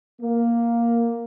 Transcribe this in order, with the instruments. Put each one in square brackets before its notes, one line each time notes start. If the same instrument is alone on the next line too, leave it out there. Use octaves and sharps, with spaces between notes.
[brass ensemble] A#3